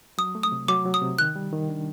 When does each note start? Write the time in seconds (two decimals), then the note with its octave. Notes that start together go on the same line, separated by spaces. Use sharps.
0.18 F#3 D#6
0.35 A3
0.43 D#6
0.52 C3
0.68 F#3 D6
0.85 F#3
0.94 D#6
1.02 C3
1.19 D#3 F#6
1.36 G3
1.53 D#3
1.69 D4